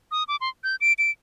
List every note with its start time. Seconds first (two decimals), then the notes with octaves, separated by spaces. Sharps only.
0.11 D#6
0.28 D6
0.41 C6
0.64 G6
0.81 D7
0.98 D7